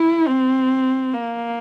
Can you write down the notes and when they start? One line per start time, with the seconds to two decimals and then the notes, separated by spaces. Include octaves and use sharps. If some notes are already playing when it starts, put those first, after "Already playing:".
Already playing: E4
0.27 C4
1.14 A#3